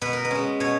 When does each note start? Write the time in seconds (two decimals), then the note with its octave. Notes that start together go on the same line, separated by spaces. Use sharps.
0.01 B2 B4
0.13 A#4
0.25 B4
0.31 G#3 C#4
0.60 B2 C#5